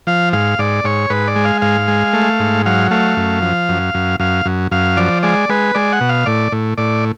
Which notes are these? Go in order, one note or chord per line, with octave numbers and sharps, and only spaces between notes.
F3 F5
G#2 F5
G#2 D5
G#2 C#5
G#2 B4
D5
G#3
F5
G#2 F5
G#3
A3
G#2
F#3 F5
A3 F5
F#2
F3
F#2
F#2
F#2 F5
F#2
F#2 F5
F3 D5
G#3 D5
G#3 B4
G#3 D5
F#5
B2
F5
A2 D5
A2
A2 D5